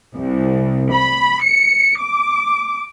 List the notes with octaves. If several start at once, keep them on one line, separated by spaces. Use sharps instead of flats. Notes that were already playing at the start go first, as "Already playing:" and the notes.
C2
B5
C#7
D6